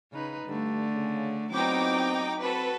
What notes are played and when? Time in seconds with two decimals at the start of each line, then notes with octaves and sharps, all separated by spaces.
0.11 C#3 D#4 B4
0.46 G2 D3 A3
0.93 C#3
1.52 A#2 F#3 B3 C4 D#4 E4 G5 D6
2.40 C4 F#4 A4 B4